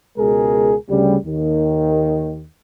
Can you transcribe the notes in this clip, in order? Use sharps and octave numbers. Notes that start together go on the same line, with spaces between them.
C#2 B2 G#3 G#4 A#4
D2 C#3 G3
D#2 D#3